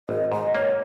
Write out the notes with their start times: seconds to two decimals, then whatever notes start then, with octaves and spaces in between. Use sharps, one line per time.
0.09 G#1 D#5
0.32 G#2 D#5
0.54 A#3 C#5